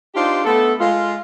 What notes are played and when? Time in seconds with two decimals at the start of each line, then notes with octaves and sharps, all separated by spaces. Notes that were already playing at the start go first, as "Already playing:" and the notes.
0.15 D4 D#4 F4 G4 C5
0.45 A3 B3 A4
0.80 G#3 F4